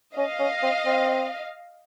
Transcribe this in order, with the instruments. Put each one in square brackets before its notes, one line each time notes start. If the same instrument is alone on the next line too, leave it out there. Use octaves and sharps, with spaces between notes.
[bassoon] C#4 [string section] D#5 F5
[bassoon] C#4
C4
C4